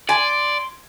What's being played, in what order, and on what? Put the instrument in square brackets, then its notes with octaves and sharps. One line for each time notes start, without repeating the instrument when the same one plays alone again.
[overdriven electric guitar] D5 [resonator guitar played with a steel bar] G#5 [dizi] C6